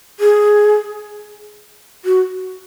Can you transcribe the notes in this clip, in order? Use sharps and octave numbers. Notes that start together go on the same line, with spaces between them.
G#4
F#4